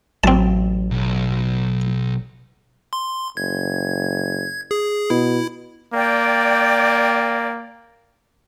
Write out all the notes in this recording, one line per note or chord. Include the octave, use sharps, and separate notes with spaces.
A1 F#3 C4 A5
B1
C6
F#1 G#6
G#4
B2 E4
A#3 D5 G5